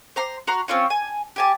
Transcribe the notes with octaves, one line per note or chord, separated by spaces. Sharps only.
C5 A#5 C6
F#4 A#5 C6
C4 C#4 F4 C#5
G#5
G4 G#5 A5